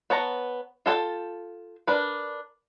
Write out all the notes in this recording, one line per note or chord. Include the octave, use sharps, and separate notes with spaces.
B3 C#5 A5 A#5
F4 A4 C#5 G5 A5
D4 A#4 B4